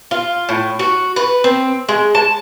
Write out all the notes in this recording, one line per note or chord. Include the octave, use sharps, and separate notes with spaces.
F4
A2
F#4
B4
C4
G#3
A5